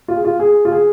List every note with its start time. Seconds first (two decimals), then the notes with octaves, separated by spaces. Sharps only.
0.08 F4
0.16 G#4
0.25 F4
0.40 G#4
0.65 F4
0.72 G#4